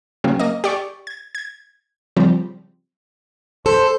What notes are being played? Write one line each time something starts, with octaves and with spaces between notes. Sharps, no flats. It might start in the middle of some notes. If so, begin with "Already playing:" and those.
C#3 F#3 A#3 C4 C#4
A#3 D#5
G4 D5 C#6
G#6
G#6
C#3 F3 G3 C4
A4 C5